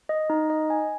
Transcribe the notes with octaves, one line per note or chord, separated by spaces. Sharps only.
D#5
D#4
D#5
G#5